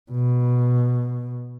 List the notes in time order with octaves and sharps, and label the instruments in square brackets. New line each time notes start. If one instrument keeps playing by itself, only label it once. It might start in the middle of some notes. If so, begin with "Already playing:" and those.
[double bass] B2